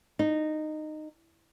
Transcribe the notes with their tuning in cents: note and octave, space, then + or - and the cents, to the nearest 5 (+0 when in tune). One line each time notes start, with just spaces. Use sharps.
D#4 -15